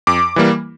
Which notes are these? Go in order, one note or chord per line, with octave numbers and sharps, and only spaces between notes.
F2 D6
E3 G3 A#3